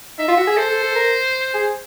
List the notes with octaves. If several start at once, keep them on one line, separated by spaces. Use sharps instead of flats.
D#4 E5
F4
F#4
G#4
A4 C5
A4
A4
A#4
G#4